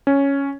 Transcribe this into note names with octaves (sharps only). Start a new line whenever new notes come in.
C#4